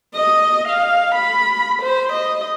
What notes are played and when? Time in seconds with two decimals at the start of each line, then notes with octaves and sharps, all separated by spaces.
0.16 D#5
0.69 F5
1.15 B5
1.83 C5
2.13 D#5